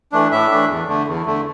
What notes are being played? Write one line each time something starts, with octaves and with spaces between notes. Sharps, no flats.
E3 A3 D4
A2 E5
E3 A3 D4
E2
D3 A3
E2
D3 A3